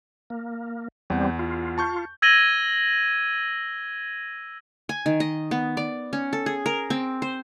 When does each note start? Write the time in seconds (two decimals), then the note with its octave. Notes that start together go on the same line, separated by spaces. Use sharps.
0.30 A#3
1.10 E2 G3 C4 F#5
1.39 F4
1.78 A5 C#6 G6
2.22 E6 G#6 A#6 D#7 F#7 G7
4.89 G#5
5.06 D#3
5.20 D#5
5.51 B3
5.77 D5
6.13 C#4
6.33 A4
6.46 G#4
6.66 A#4
6.90 C4
7.22 C5